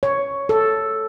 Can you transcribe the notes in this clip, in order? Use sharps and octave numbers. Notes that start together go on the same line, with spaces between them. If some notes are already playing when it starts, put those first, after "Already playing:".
C#5
A4